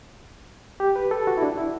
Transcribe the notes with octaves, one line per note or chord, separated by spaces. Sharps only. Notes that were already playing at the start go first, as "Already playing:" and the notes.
G4
B4
A4
F#4
E4
D4
E4